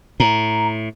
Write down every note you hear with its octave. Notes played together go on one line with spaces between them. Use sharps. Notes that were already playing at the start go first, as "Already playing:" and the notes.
A2 A#5